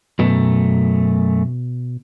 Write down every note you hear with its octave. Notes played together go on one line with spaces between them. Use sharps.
F#2 B2 A3